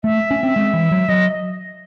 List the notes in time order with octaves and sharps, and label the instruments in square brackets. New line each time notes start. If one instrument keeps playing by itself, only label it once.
[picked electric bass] A3 [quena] E5
[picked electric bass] C#4
C4
G#3
E3
F#3
[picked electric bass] F#3 [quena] D#5